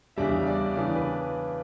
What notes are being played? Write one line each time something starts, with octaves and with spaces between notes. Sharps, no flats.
E2 C#3 G3 D4 E5
D5
C#3 E3 B3 D4 D5
B4